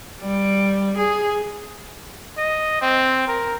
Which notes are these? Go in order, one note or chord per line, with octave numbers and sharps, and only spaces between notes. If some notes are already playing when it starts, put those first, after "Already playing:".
G3
G#4
D#5
C4
A#4